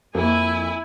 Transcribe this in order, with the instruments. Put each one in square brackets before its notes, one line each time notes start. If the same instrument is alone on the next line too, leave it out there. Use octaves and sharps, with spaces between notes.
[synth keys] F2 F3 [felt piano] A#3 [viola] E4 G#5